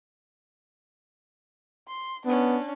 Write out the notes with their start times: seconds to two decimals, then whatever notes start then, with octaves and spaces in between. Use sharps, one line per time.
1.87 C6
2.26 B3 C#4 D4